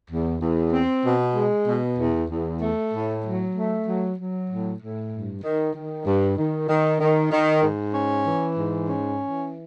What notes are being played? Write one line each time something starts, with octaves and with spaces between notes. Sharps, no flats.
E2
E2
C4
B2
G#3
B2
E2
E2
A3
A2
F#3
A3
F#3
F#3
A2
A2
G2
D#3
D#3
G2
D#3
D#3
D#3
D#3
G#2
C#4
E3
G#2
C#4
E3